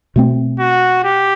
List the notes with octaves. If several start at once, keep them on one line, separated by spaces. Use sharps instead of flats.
B2 A3 C4
F#4
G4